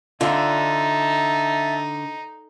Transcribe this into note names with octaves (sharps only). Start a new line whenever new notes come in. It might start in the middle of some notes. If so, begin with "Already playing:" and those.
D3 D#4 F4 E5 A5